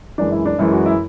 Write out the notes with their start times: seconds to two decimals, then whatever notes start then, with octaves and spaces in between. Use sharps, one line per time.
0.18 F#2 E3 G#3 D4
0.32 E4
0.45 D4
0.59 F#2 E3 G#3 E4
0.73 F#4
0.86 E4